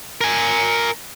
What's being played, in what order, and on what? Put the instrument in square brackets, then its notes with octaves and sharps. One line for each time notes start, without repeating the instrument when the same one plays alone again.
[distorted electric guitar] A#4 G#5